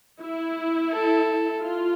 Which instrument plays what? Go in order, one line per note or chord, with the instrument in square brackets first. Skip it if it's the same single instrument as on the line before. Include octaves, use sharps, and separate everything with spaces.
[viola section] E4
[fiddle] A4
[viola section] F4